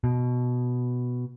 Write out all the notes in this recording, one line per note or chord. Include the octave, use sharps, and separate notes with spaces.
B2